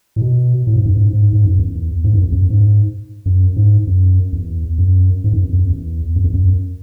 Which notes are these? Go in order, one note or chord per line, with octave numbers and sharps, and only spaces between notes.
A2
B2
A2
G#2
F#2
G#2
G#2
G#2
F#2
E2
G#2
F#2
E2
F#2
G#2
F#2
G#2
F#2
E2
F#2
G#2
F#2
E2
F#2
E2
F#2
E2
F#2